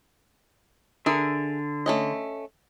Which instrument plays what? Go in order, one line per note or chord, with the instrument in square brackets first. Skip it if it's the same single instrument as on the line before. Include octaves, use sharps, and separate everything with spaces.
[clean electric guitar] D3 [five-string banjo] G#4 A#4 E5
[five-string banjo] A3 C#4 D#5